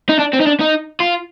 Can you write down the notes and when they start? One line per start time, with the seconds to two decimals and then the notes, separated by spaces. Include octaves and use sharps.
0.09 D#4
0.19 D4
0.33 C4
0.41 D#4
0.47 D4
0.61 D#4
1.00 F4